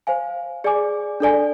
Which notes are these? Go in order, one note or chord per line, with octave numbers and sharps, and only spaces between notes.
C5 F5 G#5
G#4 D5 G#5 D6
D4 A4 D5 G#5